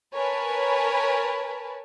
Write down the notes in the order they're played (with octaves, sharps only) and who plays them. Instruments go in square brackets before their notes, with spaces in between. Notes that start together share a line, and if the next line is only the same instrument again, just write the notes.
[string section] A#4 B4 C#5 G#5 A5 B5